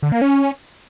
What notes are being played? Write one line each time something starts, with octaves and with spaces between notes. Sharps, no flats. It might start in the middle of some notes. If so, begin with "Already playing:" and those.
D3
A#3
C#4